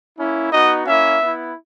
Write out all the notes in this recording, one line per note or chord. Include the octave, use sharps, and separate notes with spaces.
A#3 C#4 E4
B3 D#4 F#4 D#5
A#3 C#4 E4 E5
B3 E4